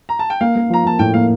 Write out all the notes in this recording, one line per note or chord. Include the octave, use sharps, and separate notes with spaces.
A#5
A5
G5
A#3 F5
A#3
F3 A#5
A#3 A5
A2 G5
A#3 F5